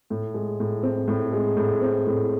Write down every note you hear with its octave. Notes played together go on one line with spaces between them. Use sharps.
A2
G#3
A2
C4
A2
G#3
A2
C4
A2